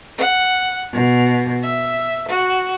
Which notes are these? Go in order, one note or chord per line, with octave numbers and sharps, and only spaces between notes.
F#5
B2
E5
F#4